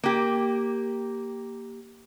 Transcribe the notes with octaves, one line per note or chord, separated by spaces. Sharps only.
A#3 G4